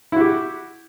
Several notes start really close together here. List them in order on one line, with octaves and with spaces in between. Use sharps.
E4 F#4 G4